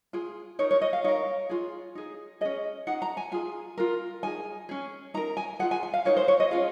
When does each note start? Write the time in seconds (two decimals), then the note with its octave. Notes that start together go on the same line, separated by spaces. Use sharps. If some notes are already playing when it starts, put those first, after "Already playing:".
0.13 F4 G#4
0.59 D#4 A#4 C#5
0.71 C#5
0.81 D#5
0.93 F5
1.04 D#4 A#4 C#5
1.50 F4 G#4
1.95 D#4 G#4
2.41 C#4 G#4 D#5
2.87 D#4 G#4 F#5
3.02 A#5
3.17 G#5
3.32 F4 G#4 G#5
3.78 F4 A#4
4.23 D#4 G#4 G#5
4.69 C#4 G#4
5.14 D#4 A#5
5.17 A#4
5.37 G#5
5.59 F4 G#4 F#5
5.71 G#5
5.83 G#5
5.94 F5
6.05 D#4 F#4 A#4 C#5
6.17 C5
6.28 C#5
6.40 D#5
6.51 C#4 F4 G#4 F5